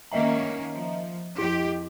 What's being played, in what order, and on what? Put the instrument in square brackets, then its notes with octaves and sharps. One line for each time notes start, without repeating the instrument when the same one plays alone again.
[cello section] D#3 A#3 C#4 [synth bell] D#5 E5 A#5
[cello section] F3
[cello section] F2 G4 [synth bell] E4 D#5